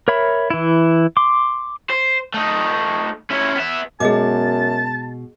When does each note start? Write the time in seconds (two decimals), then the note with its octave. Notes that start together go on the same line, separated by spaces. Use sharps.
0.08 A#4 C#5 E5 B5
0.50 E3 E4
1.17 C6 D6
1.90 C5
2.34 A3 D#4
3.30 C#4 E4
3.55 B3 E5
4.00 F#2 B2 G#3 G#4 D#5 A5 D6